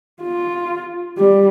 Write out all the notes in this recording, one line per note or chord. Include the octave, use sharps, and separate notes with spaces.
F4
G3